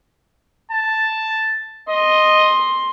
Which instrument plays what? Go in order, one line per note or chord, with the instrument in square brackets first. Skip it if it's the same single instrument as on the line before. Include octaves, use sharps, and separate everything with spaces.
[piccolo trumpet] A5
[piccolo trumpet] D#5 [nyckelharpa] C6